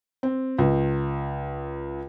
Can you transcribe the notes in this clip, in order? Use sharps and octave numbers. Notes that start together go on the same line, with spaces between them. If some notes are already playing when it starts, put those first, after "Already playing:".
C4
C#2